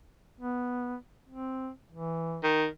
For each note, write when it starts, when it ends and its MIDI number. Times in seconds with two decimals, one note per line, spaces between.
0.40 0.96 59
1.29 1.70 60
1.92 2.44 52
2.44 2.66 51